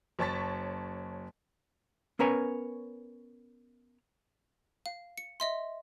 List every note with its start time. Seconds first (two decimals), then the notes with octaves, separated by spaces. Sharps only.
0.19 F#1 C#5 A5 C#6 A6 B6
2.19 B3 C#4 A#4 B4 C#5 G#5
4.86 F5
5.18 C#7
5.40 D#5 E5 C6